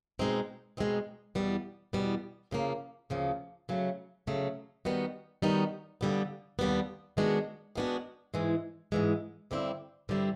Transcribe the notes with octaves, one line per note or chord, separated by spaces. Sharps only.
B2 G#3 C4 D#4
B2 G#3 C4 D#4
E2 B2 G3 B3
E2 B2 G3 B3
D2 C#3 F3 A#3
D2 C#3 F3 A#3
C#3 F#3 A3
C#3 F#3 A3
D#3 G3 B3 D#4 F#4
D#3 G3 B3 D#4 F#4
D#2 D3 G3 B3
D#2 D3 G3 B3
D#3 G#3 B3 D4 F#4
D#3 G#3 B3 D4 F#4
G#2 E3 G#3
G#2 E3 G#3
G2 D3 G3 C4 E4
G2 D3 G3 C4 E4